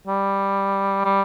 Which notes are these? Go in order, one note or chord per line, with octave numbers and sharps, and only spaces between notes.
G3
G3